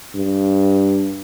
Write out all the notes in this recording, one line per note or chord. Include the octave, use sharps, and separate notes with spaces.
G2